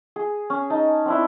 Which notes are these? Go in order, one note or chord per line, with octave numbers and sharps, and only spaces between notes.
G#4
C#4
D#4 A5
C4 D4 E4